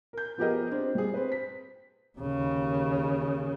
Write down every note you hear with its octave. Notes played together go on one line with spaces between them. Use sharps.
A#4 G6
F3 B3 G4 G#4 A#4 D#5
C4 D4
G3 G#4
C4 B4
B6
D#2 C#3